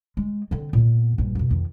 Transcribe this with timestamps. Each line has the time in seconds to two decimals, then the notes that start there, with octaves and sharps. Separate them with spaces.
0.17 G#3
0.51 D3 C4
0.73 A#2 B3
1.18 A#1 G2
1.35 F2 B2
1.51 F2 D#3